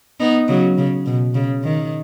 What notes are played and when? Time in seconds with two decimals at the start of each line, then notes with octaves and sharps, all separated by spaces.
0.20 B3 D#4
0.48 C#3 F#3
0.78 C#3
1.06 B2
1.34 C#3
1.63 D#3